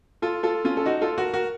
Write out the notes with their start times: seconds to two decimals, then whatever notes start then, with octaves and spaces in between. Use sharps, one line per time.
0.22 F4 A4
0.43 F4 A4
0.65 C#4 F4
0.77 A4
0.86 D#4 F#4
1.01 F4 A4
1.18 F#4 A#4
1.33 F#4 A#4